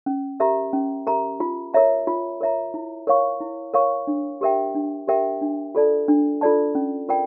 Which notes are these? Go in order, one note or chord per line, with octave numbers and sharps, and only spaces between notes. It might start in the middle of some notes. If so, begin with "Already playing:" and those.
C#4
G4 A#4 E5 A#5
C#4
G4 A#4 E5 A#5
F4
A#4 C#5 E5 A#5
F4
A#4 C#5 E5 A#5
E4
A#4 C#5 F5 C#6
E4
A#4 C#5 F5 C#6
D4
G4 A#4 E5 G5
D4
G4 A#4 E5 G5
D4
F4 A4 D5 A5
D4
F4 A4 D5 A5
C#4
F4 A#4 D5 G5